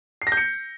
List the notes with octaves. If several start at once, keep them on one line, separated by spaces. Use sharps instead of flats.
C7
A#6
G6
C#7